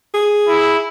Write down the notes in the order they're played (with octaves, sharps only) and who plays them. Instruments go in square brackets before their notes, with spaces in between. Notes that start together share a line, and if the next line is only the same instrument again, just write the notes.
[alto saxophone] G#4
[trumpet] E4